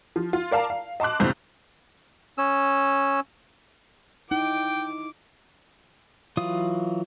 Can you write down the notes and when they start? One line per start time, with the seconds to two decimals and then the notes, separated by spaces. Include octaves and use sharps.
0.16 F3
0.33 F4
0.51 A#4 D5 F5 A5 A#5
0.70 F5
1.00 D#5 A5 C6 D6 F#6
1.19 B1 E2 G2 C#3 C4 G6
2.38 C#4 E6
4.31 D#4 E4 G5 D6
6.37 E3 F#3 F4 F5 D#6